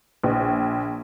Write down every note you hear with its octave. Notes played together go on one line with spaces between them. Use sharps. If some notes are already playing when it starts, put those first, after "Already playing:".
A#1